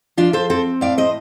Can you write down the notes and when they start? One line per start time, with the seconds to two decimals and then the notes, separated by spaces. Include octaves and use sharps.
0.17 F3 D4 F4
0.33 A4 C5
0.50 C4 A4 C5
0.81 A2 D5 F5
0.98 C5 D#5